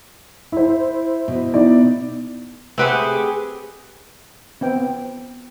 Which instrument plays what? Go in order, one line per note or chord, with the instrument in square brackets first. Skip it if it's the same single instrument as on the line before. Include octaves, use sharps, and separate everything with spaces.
[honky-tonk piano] E4 C5
[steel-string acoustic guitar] B2
[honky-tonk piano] D#4 E4 D5
[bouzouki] A3 G4 G#4 [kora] C4 B4 F#5
[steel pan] B3 C4 G5